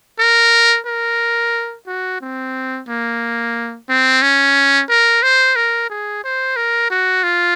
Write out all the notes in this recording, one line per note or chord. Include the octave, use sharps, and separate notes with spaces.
A#4
A#4
F#4
C4
A#3
C4
C#4
A#4
C5
A#4
G#4
C5
A#4
F#4
F4